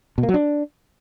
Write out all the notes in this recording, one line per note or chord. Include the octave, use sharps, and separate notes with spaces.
B2
A#3
F#3
D4